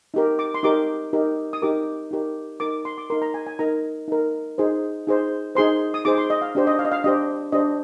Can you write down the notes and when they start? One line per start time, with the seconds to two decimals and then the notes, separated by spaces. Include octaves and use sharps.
0.14 D#4 G4 A#4
0.39 D6
0.54 C6
0.63 D#4 G4 A#4 D6
1.13 D#4 G4 A#4
1.53 D#6
1.62 D#4 G4 A#4 D6
2.11 D#4 G4 A#4
2.60 D#4 A#4 D6
2.85 C6
2.98 D6
3.10 D#4 A#4 C6
3.22 A#5
3.34 G#5
3.47 G#5
3.59 D#4 A#4 A#5
4.08 D#4 A#4
4.58 D#4 G#4 C5
5.07 D#4 G#4 C5
5.55 D#4 G#4 C5 C6
5.94 D#6
6.05 D#4 G#4 C5 D6
6.18 C6
6.30 D#5
6.42 F5
6.55 D4 G4 C5
6.67 D#5
6.79 F5
6.85 D#5
6.92 F5
7.04 D4 G4 C5 D#5
7.52 D4 G4 C5 D#5